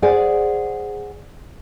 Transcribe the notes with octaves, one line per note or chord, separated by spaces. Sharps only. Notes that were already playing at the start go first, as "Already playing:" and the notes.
G#4 C5 D5 F#5 G#5